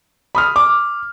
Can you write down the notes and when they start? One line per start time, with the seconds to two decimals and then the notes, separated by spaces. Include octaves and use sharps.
0.35 B5 D#6 F6
0.56 D6